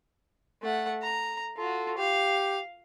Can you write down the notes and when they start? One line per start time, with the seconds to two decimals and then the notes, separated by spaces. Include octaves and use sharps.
0.63 A3 F#5
1.02 A#5
1.57 F4 F#4 A4
1.98 G4 F5